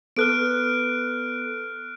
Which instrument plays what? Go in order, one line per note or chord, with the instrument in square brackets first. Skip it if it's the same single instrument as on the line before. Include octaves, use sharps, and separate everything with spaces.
[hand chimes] B3 A4 B4 [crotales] F6 F#6 D7